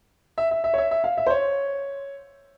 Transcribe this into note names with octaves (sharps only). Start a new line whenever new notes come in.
E5
E5
E5
C#5
E5
E5
F5
E5
C5
C#5